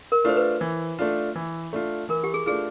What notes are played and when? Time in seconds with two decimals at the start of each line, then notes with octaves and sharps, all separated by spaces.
0.12 A#4
0.24 A3 D4 F4 C5
0.37 B4
0.61 E3
0.99 A3 D4 F4
1.36 E3
1.73 A3 D4 F4
2.09 E3 A#4
2.24 G4
2.34 G#4
2.46 A3 D4 F4 G#4